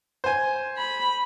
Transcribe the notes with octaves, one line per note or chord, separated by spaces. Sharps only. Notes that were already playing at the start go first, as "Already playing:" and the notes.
C5 G#5
B5